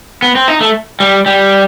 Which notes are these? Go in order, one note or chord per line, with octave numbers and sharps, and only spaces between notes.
B3
C4
D#4
A3
G3
G3